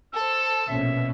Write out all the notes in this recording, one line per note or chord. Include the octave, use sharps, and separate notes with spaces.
A4 C5 E6
A#1 B2 C#4 E5